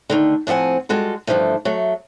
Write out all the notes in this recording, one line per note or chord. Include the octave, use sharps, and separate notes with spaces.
D3 D#3 A3
A2 F3 C4 F#5 G#5
G3 G#3 F4 F#4 A4
G2 D3 E3 F3 A3
F#3 A3